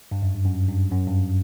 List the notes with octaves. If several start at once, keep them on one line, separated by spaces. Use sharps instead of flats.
G2
F#2
G2
F#2
G2
F#2
G2